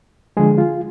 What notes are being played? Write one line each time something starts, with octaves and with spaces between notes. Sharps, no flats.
D3 F3 G#3 G#4
F4